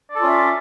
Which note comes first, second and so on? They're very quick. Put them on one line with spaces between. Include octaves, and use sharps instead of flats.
D5 A4 F4 C#4 E5